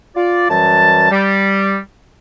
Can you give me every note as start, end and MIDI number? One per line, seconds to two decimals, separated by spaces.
0.16 0.48 65
0.16 0.48 74
0.50 1.11 42
0.50 1.11 52
0.50 1.11 55
0.50 1.11 81
1.11 1.78 55